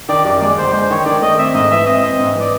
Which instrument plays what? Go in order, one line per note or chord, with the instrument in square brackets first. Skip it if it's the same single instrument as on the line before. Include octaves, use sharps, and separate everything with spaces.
[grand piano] D#3 [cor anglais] D5
[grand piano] F#2 [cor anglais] D5
[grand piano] G#3 [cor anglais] D5
[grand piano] G1 [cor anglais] C5
[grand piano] G#3 [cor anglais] C5
[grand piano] D#3 [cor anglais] C#5
[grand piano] D#3 [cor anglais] D5
[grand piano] A3 [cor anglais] D#5
[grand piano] C4 [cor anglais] E5
[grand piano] G#2 [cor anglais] D#5
[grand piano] E3 [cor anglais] E5
[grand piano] C4 [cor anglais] D#5
[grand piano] C4
G#2
[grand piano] E3 [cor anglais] D5